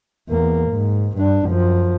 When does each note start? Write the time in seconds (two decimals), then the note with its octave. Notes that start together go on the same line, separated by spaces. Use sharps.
0.29 E2 A#3
0.71 G#2
1.17 G2 D4
1.46 F#2 F3